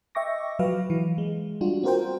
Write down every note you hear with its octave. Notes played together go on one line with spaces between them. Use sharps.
D#5 E5 G5 C#6 D6 A#6
F3 F#3 B4 F5
E3
G#3
G3 D4 F4 F#4
C4 F4 F#4 A#4 C5 G5